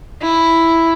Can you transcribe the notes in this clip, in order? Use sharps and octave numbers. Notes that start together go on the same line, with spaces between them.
E4